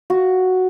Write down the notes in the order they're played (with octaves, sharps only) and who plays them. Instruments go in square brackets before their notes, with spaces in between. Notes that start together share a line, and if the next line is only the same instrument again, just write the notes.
[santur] F#4